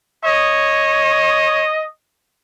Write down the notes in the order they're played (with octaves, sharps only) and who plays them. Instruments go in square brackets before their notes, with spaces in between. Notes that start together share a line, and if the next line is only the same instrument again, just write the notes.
[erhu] C#5 [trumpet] D#5